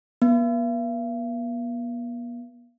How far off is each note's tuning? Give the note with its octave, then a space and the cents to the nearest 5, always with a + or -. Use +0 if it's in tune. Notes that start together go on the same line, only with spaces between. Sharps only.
B3 -45